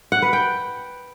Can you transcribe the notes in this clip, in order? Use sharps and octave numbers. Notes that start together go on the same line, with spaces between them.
F#5
B4
G5